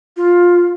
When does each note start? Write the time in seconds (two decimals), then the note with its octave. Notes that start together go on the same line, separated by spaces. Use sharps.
0.17 F4